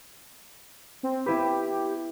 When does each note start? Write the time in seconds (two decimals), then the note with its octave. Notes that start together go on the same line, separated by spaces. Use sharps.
1.03 C4
1.26 B3 E4 G4 B4